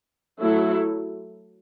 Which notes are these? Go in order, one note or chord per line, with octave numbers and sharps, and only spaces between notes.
F#3 A3 E4 A4